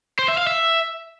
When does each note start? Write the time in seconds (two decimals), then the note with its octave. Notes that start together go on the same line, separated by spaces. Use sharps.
0.19 C5
0.28 E5
0.38 F5
0.47 E5